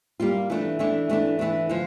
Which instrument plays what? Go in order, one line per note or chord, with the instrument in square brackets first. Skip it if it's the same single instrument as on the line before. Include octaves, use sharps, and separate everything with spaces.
[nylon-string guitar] G3 A#3 F4
E3 A3 D4
E3 A3 D4
E3 A3 D4
E3 A3 D4
D3 F3